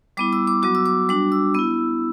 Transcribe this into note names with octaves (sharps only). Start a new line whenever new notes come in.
G3 B3 E4 D6
E6
D6
F#3 B3 F#4 D6
E6
D6
G3 D4 F#4 D6
E6
B3 E4 E6